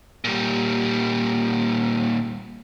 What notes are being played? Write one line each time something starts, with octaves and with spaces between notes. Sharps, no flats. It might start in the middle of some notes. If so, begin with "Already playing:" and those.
A#2 G3